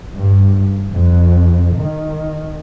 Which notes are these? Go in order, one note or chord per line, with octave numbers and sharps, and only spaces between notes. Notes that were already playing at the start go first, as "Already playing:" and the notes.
G2
F2
D#3